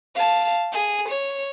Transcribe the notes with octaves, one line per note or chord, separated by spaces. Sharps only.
F5 A5
G#4
C#5